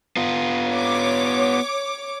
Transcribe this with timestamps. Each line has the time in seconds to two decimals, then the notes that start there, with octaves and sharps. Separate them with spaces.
0.16 B3 F4
0.69 C#5 D6